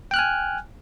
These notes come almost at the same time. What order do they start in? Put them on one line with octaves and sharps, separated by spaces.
G5 F#6 F6 G#5